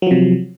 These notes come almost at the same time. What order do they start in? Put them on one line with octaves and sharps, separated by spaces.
F#3 F3 C3